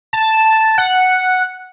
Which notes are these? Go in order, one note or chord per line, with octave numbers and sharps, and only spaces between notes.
A5
F#5